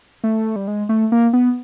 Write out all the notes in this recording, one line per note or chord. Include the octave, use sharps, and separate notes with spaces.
A3
G3
G#3
A3
A#3
B3